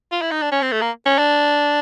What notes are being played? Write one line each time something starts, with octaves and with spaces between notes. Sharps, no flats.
F4
E4
D#4
D4
C#4
C4
A3
A#3
C#4
D4